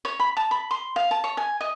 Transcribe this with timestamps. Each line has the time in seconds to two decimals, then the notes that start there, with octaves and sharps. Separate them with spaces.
0.05 C#5
0.20 B5
0.37 A5
0.51 B5
0.71 C6
0.96 F5
1.11 A5
1.24 C#5
1.37 G#5
1.61 D#5